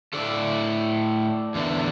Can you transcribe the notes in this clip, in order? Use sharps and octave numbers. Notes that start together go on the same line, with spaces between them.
A2 A3 A4 D5
E2 D3 A3